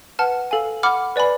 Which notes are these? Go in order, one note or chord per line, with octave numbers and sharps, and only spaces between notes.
B4 F#5 A5 F6
A4 F5 G#5
F#5 B5 D6 F6
B4 D5 G#5 B5